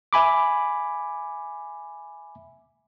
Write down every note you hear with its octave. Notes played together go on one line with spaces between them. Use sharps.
E5 G#5 B5 D6